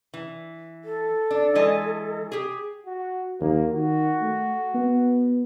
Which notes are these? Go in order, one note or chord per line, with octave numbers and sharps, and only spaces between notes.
E3
A4
D4
E3 G#3 D#5
G4 G#4
F#4
D#2 A#3
D#3 F#4
A3
B3